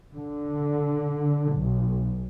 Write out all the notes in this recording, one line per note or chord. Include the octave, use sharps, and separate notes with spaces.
D3
B1